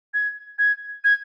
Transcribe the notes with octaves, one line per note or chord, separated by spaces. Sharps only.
G#6
G#6
G#6